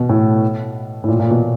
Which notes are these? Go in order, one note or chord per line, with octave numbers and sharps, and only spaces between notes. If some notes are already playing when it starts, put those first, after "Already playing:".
Already playing: B2
A2
A2
A#2
A#2
B2